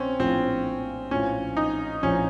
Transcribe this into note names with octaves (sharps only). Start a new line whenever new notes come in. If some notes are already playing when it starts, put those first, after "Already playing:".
Already playing: A#1 C4 C#4
A#1 A2 F3 C4
A#1 A2 F3 C#4
D#4
A#1 A2 F3 C#4